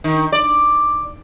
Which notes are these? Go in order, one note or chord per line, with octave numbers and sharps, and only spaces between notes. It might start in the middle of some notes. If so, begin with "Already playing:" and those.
D#3
D5